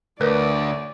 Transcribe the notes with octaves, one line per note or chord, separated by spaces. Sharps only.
D2 A#4 B4 C#5 D5